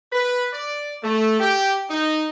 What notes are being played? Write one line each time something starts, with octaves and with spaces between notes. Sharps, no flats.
B4
D5
A3
G4
D#4